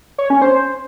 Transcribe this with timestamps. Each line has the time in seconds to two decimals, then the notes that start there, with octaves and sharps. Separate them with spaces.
0.18 C#5
0.30 C#4
0.42 C5